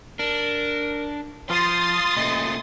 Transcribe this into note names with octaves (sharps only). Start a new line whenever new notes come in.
D4 A#4
F3 F4 C6 D#6 A6
A#2 C#3 A3 D#5